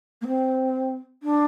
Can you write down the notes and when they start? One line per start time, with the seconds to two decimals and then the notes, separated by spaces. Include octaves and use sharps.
0.21 A#3
0.26 C4
1.23 D4